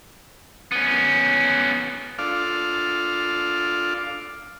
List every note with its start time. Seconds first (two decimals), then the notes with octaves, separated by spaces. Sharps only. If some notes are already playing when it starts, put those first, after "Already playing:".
0.72 B3 C#4
2.19 D4 F4 A4 D5 F5